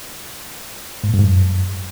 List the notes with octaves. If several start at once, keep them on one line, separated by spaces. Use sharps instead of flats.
G#2
A#2
G2
G#2
F#2